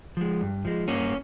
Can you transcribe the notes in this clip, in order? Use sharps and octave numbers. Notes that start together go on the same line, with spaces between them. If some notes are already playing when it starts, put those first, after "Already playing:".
F3 G#3
G2
F3 G#3
G2 A#3 C#4